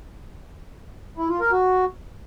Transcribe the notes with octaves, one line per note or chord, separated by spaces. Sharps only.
E4
F4
A#4
F#4